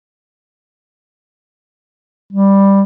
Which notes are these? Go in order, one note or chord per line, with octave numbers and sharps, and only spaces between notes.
G3